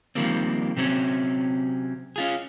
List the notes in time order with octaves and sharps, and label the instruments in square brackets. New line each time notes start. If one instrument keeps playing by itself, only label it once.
[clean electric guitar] D#3 F3 G3 A#3 C4
C3 F#3 C4 C#4
C#4 F4 G#4